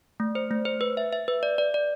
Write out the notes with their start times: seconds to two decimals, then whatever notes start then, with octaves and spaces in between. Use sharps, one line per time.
0.20 A3
0.35 C5
0.51 A3
0.65 C5
0.81 B4
0.97 E5
1.13 E5
1.28 B4
1.43 D5
1.58 D5
1.74 D5